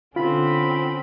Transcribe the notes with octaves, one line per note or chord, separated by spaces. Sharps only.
D3 C4 C#4 F4 B5